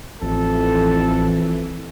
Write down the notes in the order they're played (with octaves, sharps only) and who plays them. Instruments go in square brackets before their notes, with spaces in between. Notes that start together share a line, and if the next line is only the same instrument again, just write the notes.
[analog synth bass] A1 [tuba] F2 [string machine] E3 [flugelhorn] A4